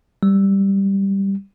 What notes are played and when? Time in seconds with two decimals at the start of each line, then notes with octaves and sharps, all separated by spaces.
0.23 G3